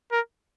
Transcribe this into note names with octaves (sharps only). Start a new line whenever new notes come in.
A#4